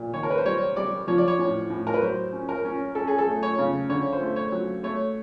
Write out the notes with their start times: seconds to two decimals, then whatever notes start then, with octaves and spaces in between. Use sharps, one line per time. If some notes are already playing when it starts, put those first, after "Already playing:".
Already playing: A#2
0.13 D#3 C#5
0.23 A#4
0.30 B4
0.38 C5
0.45 G3 C#5
0.76 G3 D5
1.08 F3 C#5
1.18 D5
1.28 C#5
1.39 A2
1.70 A2
1.87 A#4
1.94 B4
2.02 F#3 C5
2.33 C#4
2.49 A#4
2.65 C#4
2.95 C#4 A4
3.08 G#4
3.18 A4
3.27 A3
3.43 C#5
3.58 C#3
3.89 D3 C#5
4.13 C5
4.21 A3
4.36 C#5
4.52 F#3
4.83 A3 C#5